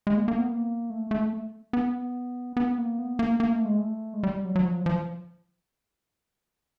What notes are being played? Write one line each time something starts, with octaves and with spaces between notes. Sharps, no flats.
G#3
A#3
A#3
B3
A#3
A3
A3
B3
B3
A#3
B3
A#3
A#3
A3
G#3
A3
G#3
G3
F#3
F#3
F3
F3